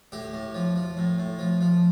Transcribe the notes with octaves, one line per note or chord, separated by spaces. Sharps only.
A2 G4
A2
F3
F3
A2
A2
F3
F3